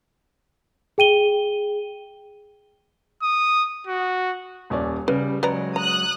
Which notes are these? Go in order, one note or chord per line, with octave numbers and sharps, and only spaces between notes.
G#4 G5 D#7 G7
D#6
F#4
D#1 C#4 D5
C#3 G3 B4
F#3 G#3 B4 D5 A#5
A#5 D#6 F#6